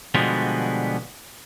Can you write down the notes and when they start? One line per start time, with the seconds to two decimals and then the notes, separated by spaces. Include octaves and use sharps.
0.14 B2 D3 F3 G3 G#3 B3